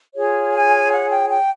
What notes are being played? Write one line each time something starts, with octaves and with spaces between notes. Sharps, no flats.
F4 G#4 C#5
G#5
F#5
G5
G5